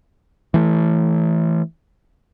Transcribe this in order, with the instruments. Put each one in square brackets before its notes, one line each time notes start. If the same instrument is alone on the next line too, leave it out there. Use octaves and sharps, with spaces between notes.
[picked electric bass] E3 A3